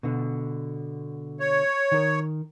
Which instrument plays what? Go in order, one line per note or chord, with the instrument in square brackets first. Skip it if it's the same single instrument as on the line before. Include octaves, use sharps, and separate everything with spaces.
[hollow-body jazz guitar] B2 D3
[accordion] C#5
[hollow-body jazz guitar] D#3 A#4